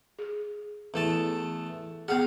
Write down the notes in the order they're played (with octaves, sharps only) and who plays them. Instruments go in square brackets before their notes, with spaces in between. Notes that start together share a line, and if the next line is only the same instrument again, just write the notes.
[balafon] G#4
[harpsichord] E2 A3 A5
[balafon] B3 G#4 [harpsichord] F5 F#5